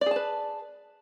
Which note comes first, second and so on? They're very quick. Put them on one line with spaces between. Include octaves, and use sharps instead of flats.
D5 G#4 A5 B4